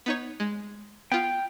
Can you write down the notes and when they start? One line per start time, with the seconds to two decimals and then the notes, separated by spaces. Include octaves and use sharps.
0.06 B3 D#4 C#5
0.40 G#3
1.12 B3 F4 G5